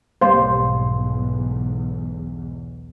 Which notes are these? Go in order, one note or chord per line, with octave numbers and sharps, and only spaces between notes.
B1 E2 G#2 G3 A#3 C5 F5 C6